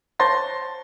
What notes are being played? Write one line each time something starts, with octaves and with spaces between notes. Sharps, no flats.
C5 C#5 A5 C6 A6 A#6